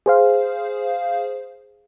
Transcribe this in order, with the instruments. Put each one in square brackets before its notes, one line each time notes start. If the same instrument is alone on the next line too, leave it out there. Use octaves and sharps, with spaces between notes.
[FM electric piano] G#4 C5 F5